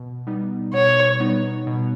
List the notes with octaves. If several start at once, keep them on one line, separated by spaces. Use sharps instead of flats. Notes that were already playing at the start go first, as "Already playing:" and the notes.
Already playing: B2
G3 B3 D#4
B2 C#5
G3 B3 D#4
B2